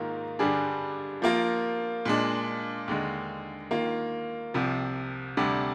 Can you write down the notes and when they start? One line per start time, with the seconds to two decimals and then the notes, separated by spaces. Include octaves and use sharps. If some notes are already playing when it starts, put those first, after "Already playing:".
Already playing: G#2 D#3 A#3 F4 A#4
0.39 G2 D3 G3 D4 G#4
1.22 F3 A#3 F4 A#4
2.05 A#2 G#3 D4
2.88 D#2 D3 G#3
3.71 D#3 A#3 F4
4.54 C2 C3 F3
5.37 D2 C3 G3 D4